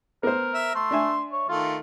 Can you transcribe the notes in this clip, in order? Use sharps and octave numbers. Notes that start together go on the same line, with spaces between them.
B3 A#4 C5
E5
A3 C6
D4 E5 G#5
C#5
D#3 A3 F4